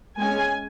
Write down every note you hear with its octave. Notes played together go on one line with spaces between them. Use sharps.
G#3 C#4 G#5